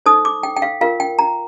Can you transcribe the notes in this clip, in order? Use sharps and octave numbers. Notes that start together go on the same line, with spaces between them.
D#4 A4 C5 D#6
D6
G5
G5
F5
F4 A#4 F5
G5
A#5